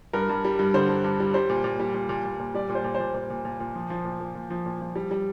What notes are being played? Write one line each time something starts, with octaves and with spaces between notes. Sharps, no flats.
G2 A#4
G2
G3
G2
D3 C5
G2
G2
G3
G3 C5
A#2
A#2
G3
A#2
A#2
A#2
A#2
G3 D5
A#2
C5
A#2
C5
A#2
A#2 C5
A#2
A#2
A#2
F3
F3
A#2
A#2
A#2
F3
A#2
F3
G3
G3